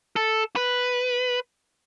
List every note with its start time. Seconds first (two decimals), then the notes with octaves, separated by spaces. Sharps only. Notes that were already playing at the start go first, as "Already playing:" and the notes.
0.16 A4
0.56 B4